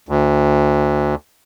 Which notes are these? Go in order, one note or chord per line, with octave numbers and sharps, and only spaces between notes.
D2